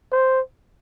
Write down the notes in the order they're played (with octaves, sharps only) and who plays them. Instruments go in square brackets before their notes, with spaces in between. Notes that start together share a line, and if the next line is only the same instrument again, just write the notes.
[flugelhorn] C5